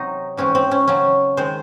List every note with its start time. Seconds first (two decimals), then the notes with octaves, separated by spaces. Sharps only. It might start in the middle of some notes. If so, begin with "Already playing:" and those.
Already playing: C3 F#3 C4 D#4
0.37 G#2 E3 G#3 C4 C#4
0.55 C4
0.71 C#4
0.88 C#3 F#3 C4 C#4
1.37 D#3 G#3 C4 C5